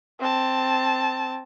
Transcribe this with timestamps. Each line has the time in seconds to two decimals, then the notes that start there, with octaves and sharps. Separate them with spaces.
0.20 C4 A5